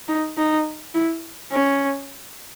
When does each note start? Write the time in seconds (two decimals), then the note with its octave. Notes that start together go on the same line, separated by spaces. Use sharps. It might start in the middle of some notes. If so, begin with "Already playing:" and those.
0.08 D#4
0.37 D#4
0.94 E4
1.52 C#4